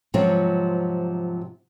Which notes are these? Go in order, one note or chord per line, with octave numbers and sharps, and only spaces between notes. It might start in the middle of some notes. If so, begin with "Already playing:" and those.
G#2 C3 F3 F#3 C4 F4